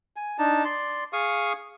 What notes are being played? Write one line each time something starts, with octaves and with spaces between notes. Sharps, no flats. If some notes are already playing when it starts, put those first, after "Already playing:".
G#5
D4 D#4 A5
D5 C6
G#4 F5 C#6 D#6